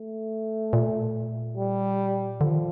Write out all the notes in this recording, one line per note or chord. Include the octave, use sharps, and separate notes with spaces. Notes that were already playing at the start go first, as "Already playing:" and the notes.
Already playing: A3
A#2
G3
D3 F3
D#3